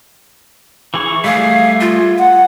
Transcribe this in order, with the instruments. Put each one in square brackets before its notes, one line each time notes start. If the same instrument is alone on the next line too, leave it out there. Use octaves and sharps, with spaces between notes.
[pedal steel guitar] E3 G#4 C#6
[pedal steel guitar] G3 A3 G#4 [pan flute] F5
[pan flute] F4
[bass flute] F#5